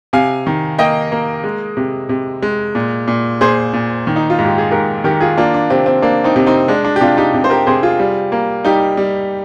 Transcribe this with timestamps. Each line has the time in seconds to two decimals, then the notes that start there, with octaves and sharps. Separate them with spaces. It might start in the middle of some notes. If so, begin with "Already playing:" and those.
0.13 C3 F5 G#5
0.47 D#3
0.79 A#3 D#5 G5
1.12 A#3
1.44 G#3
1.77 C3
2.09 C3
2.43 G#3
2.75 A#2
3.08 A#2
3.41 A#2 G#4 C5
3.73 A#2
4.07 D#3
4.16 D#4
4.30 F4
4.39 G#2
4.45 G4
4.58 G#4
4.71 G#2 G4 A#4
5.04 D#3 G4 A#4
5.21 F4 G#4
5.37 A#3 D4 F4
5.54 D4
5.70 C3 C4
5.86 C4
6.02 A#3 D4
6.24 C4 D#4
6.36 C3
6.46 C4 D#4
6.68 G#3 D4
6.84 D4
6.96 G4
7.01 C3 D4 F4
7.17 D#4 G4
7.34 C3
7.44 C5
7.50 G4 A#4
7.67 C3 G#4 C5
7.83 F4 G#4
7.99 G3
8.32 A#3
8.65 G3 D#4 G4
8.97 G3